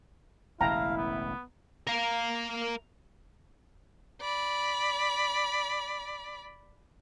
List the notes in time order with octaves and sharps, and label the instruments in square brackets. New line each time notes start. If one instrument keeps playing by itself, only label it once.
[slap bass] E1 A1 C#3 [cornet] E4 [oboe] F5 [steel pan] G5 A5 A#5
[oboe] B3
[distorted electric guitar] A#4 F5
[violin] D5 B5